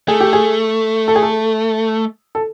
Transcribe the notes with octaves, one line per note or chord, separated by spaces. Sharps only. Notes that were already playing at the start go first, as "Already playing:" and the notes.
A3 G#4
G4
G#4
A4
G#4
A4
A4